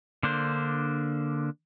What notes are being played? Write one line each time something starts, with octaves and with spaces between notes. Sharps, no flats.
D3 A#3 D4 C5